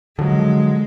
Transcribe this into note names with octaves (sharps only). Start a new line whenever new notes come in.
D3 F3 F#3 G#3